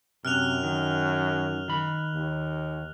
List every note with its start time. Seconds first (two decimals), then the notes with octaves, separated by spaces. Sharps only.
0.25 F#2 C3 F6 F#6 F7
0.63 D#3
1.68 D#3 B5
2.14 D#2